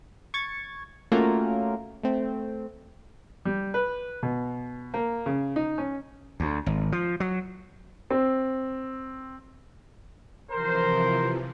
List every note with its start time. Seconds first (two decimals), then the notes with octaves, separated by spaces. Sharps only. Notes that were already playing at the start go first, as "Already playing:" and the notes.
0.34 C#6 G#6 A6
1.12 A3 A#3 C#4 F4 F#4 A#4
2.03 A3 C4
3.45 G3
3.74 B4
4.23 B2
4.94 A#3
5.26 C#3
5.56 D#4
5.78 C#4
6.40 D2
6.66 G#1
6.92 F3
7.20 F#3
8.11 C4
10.52 C3 E3 F3 A#4 C5